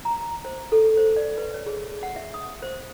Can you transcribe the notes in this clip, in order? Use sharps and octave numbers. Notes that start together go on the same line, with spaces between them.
A#5
C5
A4
C5
D5
B4
C#5
G#4
F#5
E5
D#6
C5